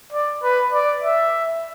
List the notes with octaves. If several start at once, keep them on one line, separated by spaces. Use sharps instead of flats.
D5
B4
D5
E5